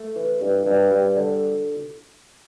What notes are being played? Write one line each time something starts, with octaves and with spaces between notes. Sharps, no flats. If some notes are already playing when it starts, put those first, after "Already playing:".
Already playing: A3
E3
G2
G2
G3
D3